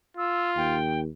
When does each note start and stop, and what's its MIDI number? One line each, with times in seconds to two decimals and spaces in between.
0.17 0.79 65
0.17 0.49 88
0.56 1.08 39
0.56 0.99 79